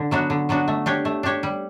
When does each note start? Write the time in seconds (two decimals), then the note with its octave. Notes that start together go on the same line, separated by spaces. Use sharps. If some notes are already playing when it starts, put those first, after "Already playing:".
Already playing: D3
0.11 F#3 B3 D4 F#4
0.30 D3
0.49 F#3 B3 D4 F#4
0.68 A3
0.86 D4 G4 C#5
1.05 A3
1.23 D4 G4 C#5
1.43 G3